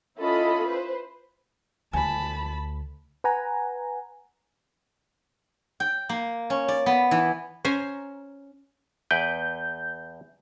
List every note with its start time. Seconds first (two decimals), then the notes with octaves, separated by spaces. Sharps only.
0.18 C#4 E4 F4 A4 D#5 B5
0.67 B4 C5
1.93 D2 G#5 A5 B5
3.24 B4 F#5 G#5 A#5
5.80 G5
6.09 A#3
6.50 C#4
6.68 D5
6.86 B3
7.11 E3
7.65 C#4 C5 G#5 A#5
9.11 E2 B4 G5 G6